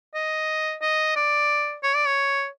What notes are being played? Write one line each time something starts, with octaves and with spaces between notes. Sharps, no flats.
D#5
D#5
D5
C#5
D5
C#5